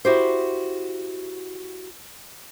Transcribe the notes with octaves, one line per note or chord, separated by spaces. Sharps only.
E4 F#4 G4 C5